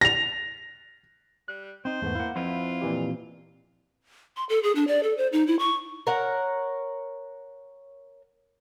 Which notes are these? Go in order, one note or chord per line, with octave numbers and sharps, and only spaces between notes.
A#6 F7
G3 F#6
C4 D#4 C5
E2 G#2 A3 B3
A#3 E4 F5 F#5
F2 E4 F4 B4 C5
A#2 E3 G4
C6
A4
G#4
D4
D5
A4
C5
D#4
E4
C#6
A#4 C#5 F#5